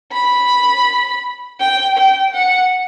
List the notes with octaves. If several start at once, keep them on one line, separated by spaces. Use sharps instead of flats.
B5
G5
G5
F#5